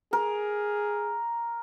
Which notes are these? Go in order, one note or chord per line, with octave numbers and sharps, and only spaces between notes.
G#4 A#4